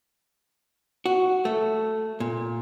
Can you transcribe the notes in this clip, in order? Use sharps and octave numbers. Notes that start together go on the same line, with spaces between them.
F#4
A3
A#2